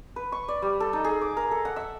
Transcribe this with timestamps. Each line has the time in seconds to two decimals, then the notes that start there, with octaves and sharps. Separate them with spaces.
0.16 B4
0.32 C#6
0.48 D5
0.62 G3
0.80 A4
0.93 D#4
1.04 G#4
1.21 D6
1.37 A#4
1.51 A4
1.65 F#5
1.76 E5